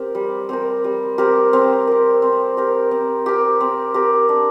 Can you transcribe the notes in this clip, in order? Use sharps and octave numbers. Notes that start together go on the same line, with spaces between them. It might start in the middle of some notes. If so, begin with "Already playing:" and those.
Already playing: C4 G4 A#4
G3
C4 G4 A#4
G3
C4 G4 A#4
C4
G4 A#4
C4
G4 A#4
C4
G4 A#4
C4
G4 A#4
D4